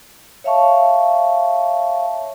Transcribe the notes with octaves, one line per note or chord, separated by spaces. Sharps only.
C#5 E5 F5 A5 C#6